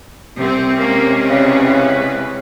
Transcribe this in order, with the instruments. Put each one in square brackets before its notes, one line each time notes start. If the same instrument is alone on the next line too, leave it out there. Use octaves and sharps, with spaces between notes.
[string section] C2 C4 [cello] C3
[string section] G#3 C#4 [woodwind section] A#3
[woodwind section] E2 C#3 B4